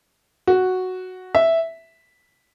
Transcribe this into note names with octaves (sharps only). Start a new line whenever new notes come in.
F#4
E5